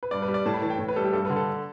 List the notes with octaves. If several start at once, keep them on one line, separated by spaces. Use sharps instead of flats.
B4
G2 D5
B4
G3
D5
A2 A5
B5
E3 A5
G5
A2
B4
G3 A4
G4
G2 A4
D3 B4
A4